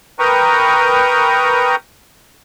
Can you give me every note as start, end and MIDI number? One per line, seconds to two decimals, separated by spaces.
0.19 1.76 70
0.19 1.76 71
0.19 1.76 79
0.19 1.76 82
0.19 1.76 85
0.19 1.76 87